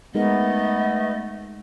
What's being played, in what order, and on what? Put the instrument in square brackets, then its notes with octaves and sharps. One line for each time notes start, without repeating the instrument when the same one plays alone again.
[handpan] G#3 D#4 A#4 [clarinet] A3 [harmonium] B3 [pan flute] D#5